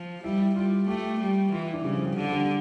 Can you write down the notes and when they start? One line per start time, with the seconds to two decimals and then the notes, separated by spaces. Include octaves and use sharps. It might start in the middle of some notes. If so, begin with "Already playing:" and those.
Already playing: F3
0.24 G3 E4
0.55 G3 F4
0.88 A3 G4
1.20 G3
1.52 E3 F4
1.63 E4
1.74 D4
1.84 C#3 G3
1.94 F3
2.06 G3
2.16 D3
2.32 G3